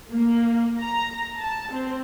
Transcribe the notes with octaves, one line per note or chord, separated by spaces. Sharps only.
A#3
A#5
A5
C4